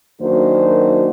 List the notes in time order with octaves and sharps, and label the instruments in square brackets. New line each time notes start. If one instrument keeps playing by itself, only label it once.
[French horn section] F#2 D#3 A#3 D4 F#4 C5